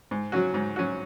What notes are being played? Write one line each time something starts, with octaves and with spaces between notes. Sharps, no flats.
G#2
F#3 C#4 F#4
G#2
F#3 C#4 F#4